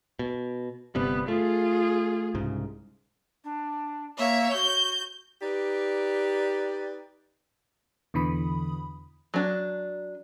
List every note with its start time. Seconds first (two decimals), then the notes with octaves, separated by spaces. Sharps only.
0.19 B2
0.95 G1 C3 G3 B3
1.28 A3 F4 G#4
2.34 C2 G#2 C#3
3.44 D4
4.18 A#3 C#5 E5
4.53 F#4 G6
5.41 D#4 G4 B4 D5
8.14 E2 B2 D3 E3 B5 D#6
9.34 F#3 D4